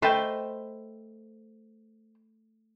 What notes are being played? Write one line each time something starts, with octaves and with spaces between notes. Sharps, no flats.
A3 B4 C5 D#5 G5 A5